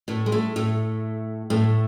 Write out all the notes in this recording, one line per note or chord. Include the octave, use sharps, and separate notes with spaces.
A2 A3
G#3
A2 A3
A2 A3
A2 A3